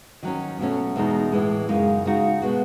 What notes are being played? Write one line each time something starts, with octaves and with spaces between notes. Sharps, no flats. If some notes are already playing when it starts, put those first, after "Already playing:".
D#3 F#3 C#4
B2 F#3 A3 C#4
E2 B2 G#3 D#4
A2 E3 G#3
F#2 C#3 G#3 D#4
C#3 G#3 D#4 F#4
B2 G#3 B3 F#4